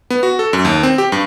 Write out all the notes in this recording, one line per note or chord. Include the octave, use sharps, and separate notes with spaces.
B3
F#4
A4
F#2
D#2
C4
G4
G2